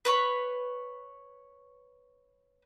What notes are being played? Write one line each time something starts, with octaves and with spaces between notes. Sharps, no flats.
B4 C#5 C#6